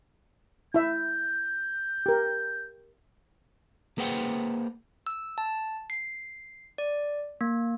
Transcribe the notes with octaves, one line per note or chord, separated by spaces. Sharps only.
E4 E5 G6
G4 A#4
A#3 G#4 B4 C5 F#5 G5
E6
A5
C7
D5
A#3